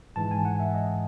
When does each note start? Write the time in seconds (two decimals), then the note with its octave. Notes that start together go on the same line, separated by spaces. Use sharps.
0.16 G#2 E3 G#3 A5
0.31 G#5
0.45 F#5
0.60 E5
0.74 D#5